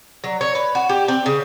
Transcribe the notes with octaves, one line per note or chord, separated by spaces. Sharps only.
F#3
C#5
B4
F#4
G4
C4
C#3